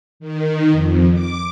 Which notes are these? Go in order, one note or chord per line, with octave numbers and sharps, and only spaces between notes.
D#3
F2
D6